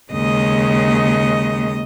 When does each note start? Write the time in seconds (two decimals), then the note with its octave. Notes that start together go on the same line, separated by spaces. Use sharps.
0.11 D#2 C#3 G#3 D#5